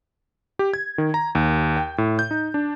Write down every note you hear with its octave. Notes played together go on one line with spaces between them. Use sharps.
G4
G#6
D#3
A#5
D#2
G5
A2
G6
D#4
D4